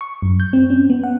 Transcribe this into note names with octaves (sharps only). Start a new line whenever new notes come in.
C#6
F#2
G6
C4
C#4
B3
F#5